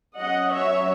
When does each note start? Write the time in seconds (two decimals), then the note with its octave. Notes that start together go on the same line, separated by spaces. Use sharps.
0.20 F#3 C#4 D#5 F#5
0.54 C#5 E5